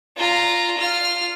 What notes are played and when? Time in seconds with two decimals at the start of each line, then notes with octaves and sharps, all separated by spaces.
0.17 F4 A#5
0.77 F4 F6